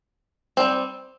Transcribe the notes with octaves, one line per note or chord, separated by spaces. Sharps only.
G3 C4